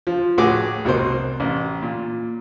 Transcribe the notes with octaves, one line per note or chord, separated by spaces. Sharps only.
F3
A2 F#4 G#4 D6
C2 B2 A#4 C5
A1
A#2